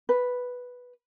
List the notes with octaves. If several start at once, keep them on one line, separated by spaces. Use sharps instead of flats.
B4